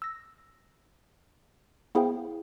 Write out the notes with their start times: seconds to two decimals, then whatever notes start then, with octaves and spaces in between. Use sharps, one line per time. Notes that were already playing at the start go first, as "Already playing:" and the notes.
0.02 E6 A#6
1.95 B3 E4 G#4 C5 F5 G5